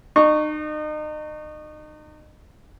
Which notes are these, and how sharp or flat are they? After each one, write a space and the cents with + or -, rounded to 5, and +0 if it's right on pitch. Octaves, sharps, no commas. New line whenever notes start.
D#4 -35 C#6 +0